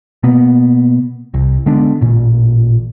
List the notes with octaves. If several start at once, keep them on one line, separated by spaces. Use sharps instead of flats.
B2 A#3 B3
C2
D3 G#3 B3 D4
A1 A#2